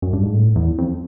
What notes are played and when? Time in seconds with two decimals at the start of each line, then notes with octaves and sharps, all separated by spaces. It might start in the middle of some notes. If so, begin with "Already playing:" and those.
0.02 F#2
0.13 G2
0.22 G#2
0.33 A2
0.56 E2
0.78 F2